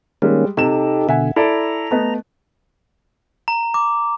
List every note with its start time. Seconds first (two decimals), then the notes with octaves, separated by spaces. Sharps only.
0.22 D#3 G3 G#3 A#3 C#4
0.57 C3 D#4 G4 A4 E7
1.09 B2 D3 E5 F#5 G#5
1.36 E4 A4 D5 A#5
1.91 A3 B3 D#5
3.48 A#5
3.74 D6